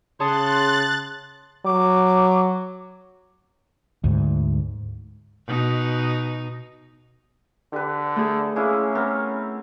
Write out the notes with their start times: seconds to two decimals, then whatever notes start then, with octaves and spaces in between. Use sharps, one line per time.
0.20 C#3 C#5 A5 C6 D#6 F#6 A6
1.66 F#3 D6
4.04 D2 G#2
5.47 B2 D#4
7.73 D3 G4 B4
8.16 A3 G#4
8.56 G#3 A#3 C#4 E4
8.95 B3 C4 A#4